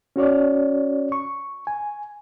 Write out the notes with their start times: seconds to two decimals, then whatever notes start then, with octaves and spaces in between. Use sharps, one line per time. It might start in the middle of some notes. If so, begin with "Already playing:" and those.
0.16 C#4 F#4 C#5 D5
1.12 C#6
1.67 G#5